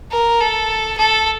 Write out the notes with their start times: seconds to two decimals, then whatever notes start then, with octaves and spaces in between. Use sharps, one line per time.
0.11 A#4
0.40 A4
0.97 A4